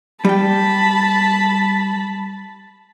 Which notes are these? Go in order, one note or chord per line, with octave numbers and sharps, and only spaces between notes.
G3 G5 A5 B5